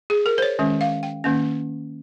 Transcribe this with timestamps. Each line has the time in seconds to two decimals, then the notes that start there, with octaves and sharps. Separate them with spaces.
0.10 G#4
0.26 A#4
0.38 C5
0.42 C#5
0.59 D#3 G#3 C#4
0.81 F5
1.03 G5
1.24 D#3 A#3 C#4